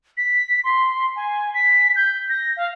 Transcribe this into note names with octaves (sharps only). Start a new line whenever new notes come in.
B6
C6
G#5
B6
G6
A#6
F5